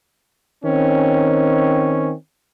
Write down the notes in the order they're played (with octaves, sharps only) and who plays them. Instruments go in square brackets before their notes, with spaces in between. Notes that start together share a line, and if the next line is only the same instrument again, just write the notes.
[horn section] D#3 C4 C#4